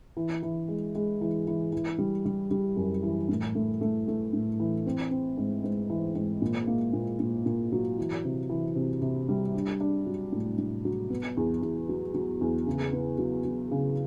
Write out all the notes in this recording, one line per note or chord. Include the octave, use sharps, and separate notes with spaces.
E3
E3
G#3
G#3
E3
E3
E3
G3
G3
G3
F#2
E3
A2
A3
A3
A3
A2
E3
C4
C4
G#2
G#2
E3
G#2
A#2
A#3
A#2
A#2
A#2
F#3
E3
C3
E3
C3
C3
G3
D4
D4
F#3
A2
A2
F#3
B3
E2
E2
F#3
F#3
E2
C#3
B3
F#3
F#3
C#3